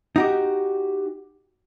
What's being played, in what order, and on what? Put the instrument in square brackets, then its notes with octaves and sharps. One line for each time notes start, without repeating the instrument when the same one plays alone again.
[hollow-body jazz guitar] D#4 F#4 G4